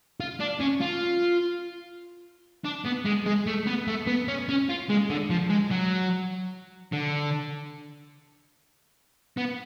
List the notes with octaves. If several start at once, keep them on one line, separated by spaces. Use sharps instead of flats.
F4
D4
C#4
F4
D4
B3
G#3
G#3
A3
B3
A3
B3
C#4
C#4
F4
G#3
D3
F3
G#3
F#3
D3
B3